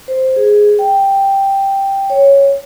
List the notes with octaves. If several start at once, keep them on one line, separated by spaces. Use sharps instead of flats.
C5
G#4
G5
C#5